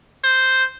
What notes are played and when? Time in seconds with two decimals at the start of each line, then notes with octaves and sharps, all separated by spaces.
0.24 C5